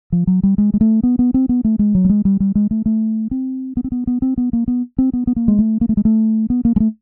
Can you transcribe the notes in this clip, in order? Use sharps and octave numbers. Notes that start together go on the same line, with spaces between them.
F3
F#3
G3
G#3
G#3
A3
B3
B3
C4
B3
A3
G#3
F#3
G3
G#3
G3
G3
G#3
A3
A3
C4
B3
C4
B3
B3
C4
B3
A#3
B3
C4
B3
B3
A#3
G#3
A3
A#3
A3
G#3
A3
B3
A#3
G#3
A3